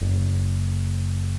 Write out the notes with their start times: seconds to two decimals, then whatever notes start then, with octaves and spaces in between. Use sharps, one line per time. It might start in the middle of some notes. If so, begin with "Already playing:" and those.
0.01 F#1